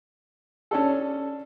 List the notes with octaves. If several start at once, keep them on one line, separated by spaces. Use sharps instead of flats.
C#4 D4 A4